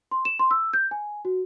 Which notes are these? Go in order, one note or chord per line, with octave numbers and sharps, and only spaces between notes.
C6
E7
C6
E6
G6
G#5
F#4